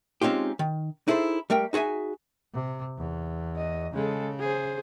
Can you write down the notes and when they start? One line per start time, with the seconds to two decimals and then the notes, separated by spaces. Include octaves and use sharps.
0.22 G#3 C4 C#4 D#4 F4 G4
0.59 D#3
1.08 D#4 E4 G#4 A4 C5
1.50 G3 A3 A#4 G5
1.73 D#4 F#4 G#4 E5 G#5
2.53 C3
2.98 E2
3.56 D#5
3.94 C#3 G#3 A4
4.40 G#4 C5